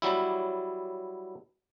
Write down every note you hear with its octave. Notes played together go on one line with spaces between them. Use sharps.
F#3 G3 E4